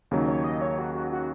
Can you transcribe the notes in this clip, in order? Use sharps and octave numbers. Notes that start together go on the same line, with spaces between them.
D#2 C#3 F#3 D#4
C#5
D#5
C#5
F#4
F#4
F#4